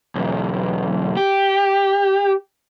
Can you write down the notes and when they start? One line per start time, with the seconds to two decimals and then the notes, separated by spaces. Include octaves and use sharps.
0.15 B1 E2
1.17 G4